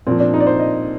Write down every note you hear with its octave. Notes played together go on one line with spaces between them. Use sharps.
A#2 F3 C4
D4
D#4
D5
C5
D#5